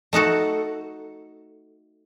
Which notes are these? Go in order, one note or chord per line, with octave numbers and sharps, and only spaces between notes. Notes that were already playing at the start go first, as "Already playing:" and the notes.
A3 D#4 F#4 A4